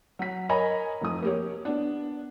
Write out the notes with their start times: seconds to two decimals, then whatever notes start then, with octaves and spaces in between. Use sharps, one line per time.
0.19 F#3 B6
0.49 A#4 C#5 D#5 G#5 A#5 B5
1.01 F1 F3 D#6
1.23 A#3 G4 C#5
1.65 B3 D4